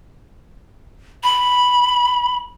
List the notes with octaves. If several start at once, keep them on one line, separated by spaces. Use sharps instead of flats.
B5